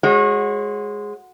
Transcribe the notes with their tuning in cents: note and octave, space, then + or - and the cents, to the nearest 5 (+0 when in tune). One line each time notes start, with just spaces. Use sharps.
G#3 +0 F#4 -10 C#5 -35